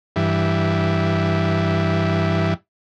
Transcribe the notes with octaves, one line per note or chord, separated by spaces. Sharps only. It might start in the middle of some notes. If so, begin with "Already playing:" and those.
G2 E3